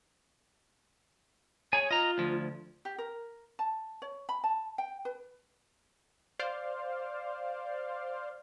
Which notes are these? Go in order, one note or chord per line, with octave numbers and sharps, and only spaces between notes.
G#4 C#5 G#5
F4 D#5 A#5
D2 F3
G4
A#4
A5
C#5
B5
A5
G5
B4
C5 D5 F5